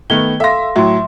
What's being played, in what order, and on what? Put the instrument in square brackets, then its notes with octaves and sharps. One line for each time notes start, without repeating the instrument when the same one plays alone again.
[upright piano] D#3 A3 B3 [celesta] G#6 G7
[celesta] A4 F5 C6 [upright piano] E5 A#6
[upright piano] A2 F#3 [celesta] E5 C6